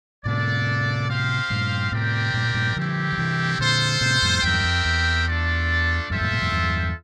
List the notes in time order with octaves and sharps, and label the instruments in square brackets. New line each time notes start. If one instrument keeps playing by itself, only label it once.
[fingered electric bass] A2 C3 [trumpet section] A#3 D4 A4 D5
[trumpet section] C4 G4 C5 F5
[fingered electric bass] G2 A#2
[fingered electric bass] A2 C3 [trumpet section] C4 G4 A#4 D5 G5
[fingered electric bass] G2 A#2
C3
G2 A#2
[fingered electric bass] D3 F3 [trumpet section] A3 C4 E4 G4
[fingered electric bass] F3
C3 E3
[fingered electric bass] A#2 D3 [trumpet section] F4 A4 C5
[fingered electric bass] A2 C3
F2 A2
[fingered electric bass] E2 G2 [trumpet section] C4 G4 A#4 E5 G5
[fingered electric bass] F2
E2
[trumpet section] A3 D4 F4 A4 D5
[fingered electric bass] E2 G2 [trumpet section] F4 A4 C5 E5 G5
[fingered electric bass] F2 A2
G2 A#2
F2 A2
E2 G2